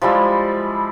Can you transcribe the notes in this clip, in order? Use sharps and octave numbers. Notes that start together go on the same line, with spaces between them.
F3 G3 G#3 E4